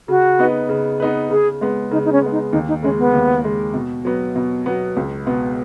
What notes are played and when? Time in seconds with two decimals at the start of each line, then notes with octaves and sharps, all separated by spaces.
0.08 C#3 F#4
0.39 B3 D#4 B4
0.69 C#3
1.00 B3 D#4 B4
1.30 C#3 G#4
1.61 G#3 B3
1.91 C#3 D#4
2.05 D#4
2.12 C#4
2.22 G#3 B3
2.32 D#4
2.52 D#2 D#4
2.68 D#4
2.83 C#3 G#3 C#4
2.99 B3
3.13 D#2
3.44 C#3 G#3
3.74 B2
4.05 F#3 B3
4.36 B2
4.66 F#3 B3
4.97 C#2
5.27 B2 B3